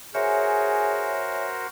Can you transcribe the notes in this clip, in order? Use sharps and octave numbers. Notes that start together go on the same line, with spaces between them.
F#4 G#4 A#4 C5 C#5 E5 G#5